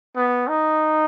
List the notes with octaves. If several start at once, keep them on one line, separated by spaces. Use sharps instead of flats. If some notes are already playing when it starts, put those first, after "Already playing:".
B3
D#4